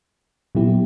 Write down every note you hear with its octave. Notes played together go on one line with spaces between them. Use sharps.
A#2 F#3 B3 E4 G4